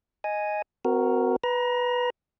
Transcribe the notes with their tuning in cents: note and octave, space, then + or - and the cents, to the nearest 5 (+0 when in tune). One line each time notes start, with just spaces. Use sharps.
D#5 +0 G#5 +0
C4 -35 F#4 +0 A#4 +0
B4 +0 A#5 +25